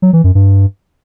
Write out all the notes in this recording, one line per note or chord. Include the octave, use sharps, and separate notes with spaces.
F#3
E3
F#2
G2